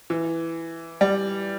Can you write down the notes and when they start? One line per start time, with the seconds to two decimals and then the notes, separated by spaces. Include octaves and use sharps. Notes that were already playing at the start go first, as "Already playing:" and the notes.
0.10 E3
1.01 G3